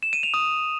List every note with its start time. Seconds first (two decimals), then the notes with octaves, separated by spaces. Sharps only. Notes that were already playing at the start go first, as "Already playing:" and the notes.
0.03 E7
0.13 D#7
0.23 F7
0.34 D#6